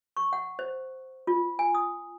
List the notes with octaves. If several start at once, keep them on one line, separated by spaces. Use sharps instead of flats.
C#6
F#5
C5
F4
G#5
D#6